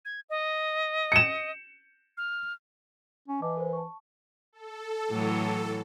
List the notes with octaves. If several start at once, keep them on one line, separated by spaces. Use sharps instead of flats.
G#6
D#5
C#7 E7
F6
C#4
E3 D#5 A5 D6
A#4 C5
A5 C#6
A4
A2 E3 F#3